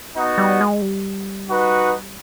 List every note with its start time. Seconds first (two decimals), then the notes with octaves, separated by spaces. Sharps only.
0.16 B3 D#4 F#4
0.38 G3
0.61 G#3
0.82 G3
1.48 D#4 F#4 B4